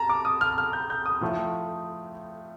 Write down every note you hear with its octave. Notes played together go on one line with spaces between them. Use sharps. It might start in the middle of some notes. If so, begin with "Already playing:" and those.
Already playing: A5 A#5
D6
D#6
F6
F6
G6
G6
D#6
A2 F3 A3